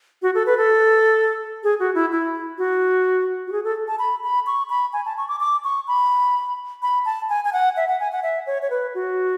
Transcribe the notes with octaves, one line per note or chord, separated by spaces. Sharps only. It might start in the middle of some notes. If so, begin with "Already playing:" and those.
F#4
A4
B4
A4
G#4
F#4
E4
E4
F#4
F#4
G#4
A4
A5
B5
B5
C#6
B5
G#5
A5
C#6
D6
D6
C#6
B5
B5
A5
G#5
G#5
F#5
E5
F#5
G#5
F#5
E5
C#5
C#5
B4
F#4